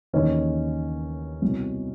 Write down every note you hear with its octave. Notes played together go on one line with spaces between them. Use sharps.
D#2 C#3 E3 C#4 D#4
C2 B2